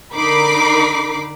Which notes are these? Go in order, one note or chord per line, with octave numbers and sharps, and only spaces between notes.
D3 D#4 A#4 B5 D6 C7